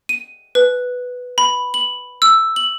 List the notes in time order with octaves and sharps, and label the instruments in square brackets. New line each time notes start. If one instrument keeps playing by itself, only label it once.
[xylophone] D#7
B4
B5
F#7
E6
F#7